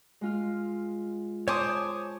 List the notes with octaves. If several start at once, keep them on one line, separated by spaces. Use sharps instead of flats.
G#3 F4 F6
C5 C#5 G#5 A5 D6 D#6